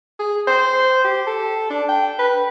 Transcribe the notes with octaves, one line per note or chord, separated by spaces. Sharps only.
G#4
C5
G4
A4
D4
G5
B4